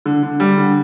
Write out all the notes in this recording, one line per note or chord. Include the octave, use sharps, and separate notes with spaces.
D3
D3
G3
D3